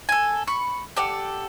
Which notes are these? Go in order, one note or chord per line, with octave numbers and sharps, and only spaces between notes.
A4 G#5
B5 C#6
G4 A4 D5 F#5